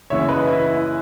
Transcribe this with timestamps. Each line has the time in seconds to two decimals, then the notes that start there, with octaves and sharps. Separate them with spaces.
0.10 F#2 C#3 E3 C#5 E5
0.29 B4 D#5
0.47 E4
0.66 E4